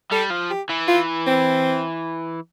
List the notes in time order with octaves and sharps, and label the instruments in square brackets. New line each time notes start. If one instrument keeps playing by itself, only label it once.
[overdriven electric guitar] G3 [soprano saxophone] A4
[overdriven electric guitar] F3
[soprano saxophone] G4
[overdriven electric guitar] E3
[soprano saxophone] F4
C4